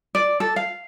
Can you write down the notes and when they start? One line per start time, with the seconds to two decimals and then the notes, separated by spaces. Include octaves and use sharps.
0.15 D5
0.40 A4
0.56 F5